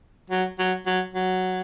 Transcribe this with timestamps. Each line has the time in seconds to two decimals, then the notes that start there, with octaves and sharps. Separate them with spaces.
0.30 F#3
0.59 F#3
0.86 F#3
1.14 F#3